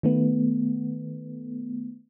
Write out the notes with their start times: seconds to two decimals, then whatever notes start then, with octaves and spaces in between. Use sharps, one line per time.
0.03 D#3 A3 B3